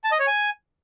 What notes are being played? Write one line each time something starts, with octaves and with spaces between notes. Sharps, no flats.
A5
D#5
C#5
G#5